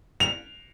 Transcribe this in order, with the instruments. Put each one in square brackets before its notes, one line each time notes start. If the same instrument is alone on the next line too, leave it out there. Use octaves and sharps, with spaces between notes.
[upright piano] F7